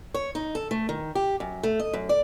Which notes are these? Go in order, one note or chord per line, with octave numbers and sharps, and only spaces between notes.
C#5
D#4
A4
A3
D#3
G4
F#2
A3
D#5
F#2
D5